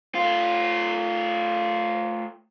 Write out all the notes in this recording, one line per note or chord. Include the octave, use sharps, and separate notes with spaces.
A3 F4